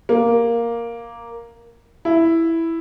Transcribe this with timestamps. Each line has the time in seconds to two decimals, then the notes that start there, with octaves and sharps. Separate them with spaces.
0.09 A#3
2.05 E4